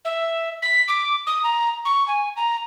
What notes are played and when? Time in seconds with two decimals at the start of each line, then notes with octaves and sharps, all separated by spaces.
0.05 E5
0.62 B6
0.88 D6
1.27 D#6
1.43 A#5
1.85 C#6
2.08 G#5
2.36 A#5